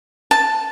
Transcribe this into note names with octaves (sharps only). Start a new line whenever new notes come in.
A5